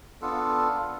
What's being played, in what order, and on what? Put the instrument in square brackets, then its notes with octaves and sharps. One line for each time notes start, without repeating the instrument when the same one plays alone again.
[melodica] B3 D4 F4 A4